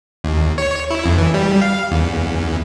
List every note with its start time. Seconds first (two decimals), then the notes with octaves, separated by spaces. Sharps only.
0.24 D#2
0.58 C#5
0.90 E4
1.05 F2
1.18 E3
1.34 G3
1.61 F5
1.91 E2